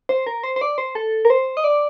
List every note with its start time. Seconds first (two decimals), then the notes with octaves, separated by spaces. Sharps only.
0.09 C5
0.27 A#4
0.43 C5
0.56 C5
0.61 D5
0.78 C5
0.95 A4
1.25 A#4
1.30 C5
1.57 D#5
1.64 D5